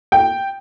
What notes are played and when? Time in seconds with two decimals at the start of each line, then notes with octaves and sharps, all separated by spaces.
0.12 G5